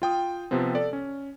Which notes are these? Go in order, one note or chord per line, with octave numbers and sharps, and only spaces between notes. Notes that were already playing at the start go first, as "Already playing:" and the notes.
F4 G5 D#6
C3 F3 B3 C4
A4 D5
C#4